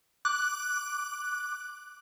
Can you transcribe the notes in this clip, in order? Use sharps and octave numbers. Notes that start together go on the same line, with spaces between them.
D6 F#6